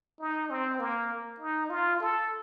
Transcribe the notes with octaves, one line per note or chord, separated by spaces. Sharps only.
D#4
C4
A#3
D#4
F4
A4